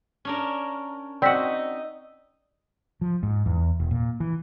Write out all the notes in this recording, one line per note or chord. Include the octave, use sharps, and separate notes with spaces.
C#4 D4 A#4
C4 D#4 F#4 D5 D#5 E6 B6
F3
G#2
E2
E1
A#2
E3